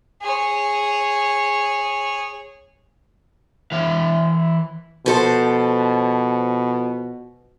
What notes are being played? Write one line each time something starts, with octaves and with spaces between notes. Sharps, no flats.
G#4 C#5
E3 F5
B2 F3 A4 C5